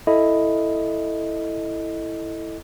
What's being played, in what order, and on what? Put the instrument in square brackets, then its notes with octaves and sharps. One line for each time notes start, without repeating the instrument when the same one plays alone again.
[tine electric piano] E4 A4 D#5